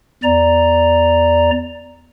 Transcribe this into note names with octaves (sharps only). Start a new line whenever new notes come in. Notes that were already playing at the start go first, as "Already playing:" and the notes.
E2 D5 A#5